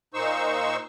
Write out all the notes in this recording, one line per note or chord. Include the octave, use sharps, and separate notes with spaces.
A#2 D#4 C5 C#6 E6